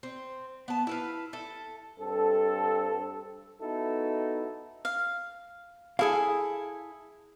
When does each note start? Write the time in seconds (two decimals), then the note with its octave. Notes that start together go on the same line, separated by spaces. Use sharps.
0.03 C4
0.68 B3 A5
0.87 E4 B4 F5
1.33 A4 E5
2.00 G2 C4 A4
3.61 B3 D#4 E4 F#4 A4
4.85 F5
5.99 E4 G#4 A4 F5 G#5